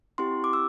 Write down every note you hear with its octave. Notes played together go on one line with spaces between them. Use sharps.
C4 E4 G4 C6
D6
E6